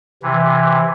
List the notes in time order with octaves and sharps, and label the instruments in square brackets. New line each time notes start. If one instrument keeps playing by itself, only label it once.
[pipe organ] C3 E3